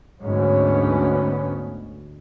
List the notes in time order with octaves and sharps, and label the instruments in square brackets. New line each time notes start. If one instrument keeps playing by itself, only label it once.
[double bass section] D2 G#2 B3 C#4